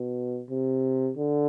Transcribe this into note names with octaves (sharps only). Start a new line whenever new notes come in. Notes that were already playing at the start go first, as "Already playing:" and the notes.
Already playing: B2
C3
D3